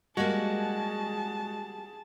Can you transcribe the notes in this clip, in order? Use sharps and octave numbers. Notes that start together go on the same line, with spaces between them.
G3 G#3 A#3 F#4 G#4 A5